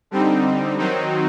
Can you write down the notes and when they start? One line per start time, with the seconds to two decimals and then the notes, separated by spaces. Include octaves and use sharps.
0.11 D3 G3 C4 D#4
0.79 D#3 F#3 C4 D#4